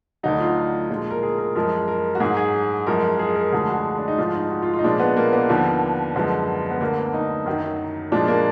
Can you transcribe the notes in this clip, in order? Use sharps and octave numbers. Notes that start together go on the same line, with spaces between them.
D2 D3 F#3 D#4
F4
A#2 F3 G#3
A#4
G#4
A#4
F#2 F3 G#3 A#4
A#4
F#4
G#2 F#3 G#4
G#4
F#2 F3 G#3 A#4
G#4
A#4
D2 D3 F3 G#3 G#4
F#4
D4
D#4
G#2 F3 G#3 F4
D#4
F#4
F4
F4
D#4
A#2 F3 G#3 D4
B3
A#3
B3
D#2 D3 F3
F#2 D3 F3 G#3 B3
B3
D2 D3 F#3 A#3
B3
D#4
F#2 D#3 F#3
A#2 F3 G#3 D4
A#3